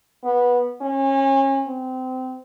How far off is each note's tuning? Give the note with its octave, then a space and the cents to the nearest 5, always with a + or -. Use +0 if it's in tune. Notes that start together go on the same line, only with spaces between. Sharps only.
B3 -15
C#4 -30
C4 -25